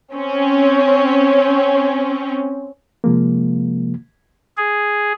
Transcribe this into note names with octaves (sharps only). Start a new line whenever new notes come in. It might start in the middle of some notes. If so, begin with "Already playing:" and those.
C4 C#4
C3 F3 G#3 A#3
G#4